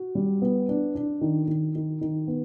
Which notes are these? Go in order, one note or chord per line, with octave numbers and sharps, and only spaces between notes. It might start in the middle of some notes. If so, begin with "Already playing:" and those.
Already playing: F#4
G3
B3
D4
D4
D#3
D#3
D#3
D#3
B3